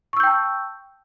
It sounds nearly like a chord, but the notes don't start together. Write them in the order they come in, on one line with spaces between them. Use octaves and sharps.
C#6 E6 G6 G5 A5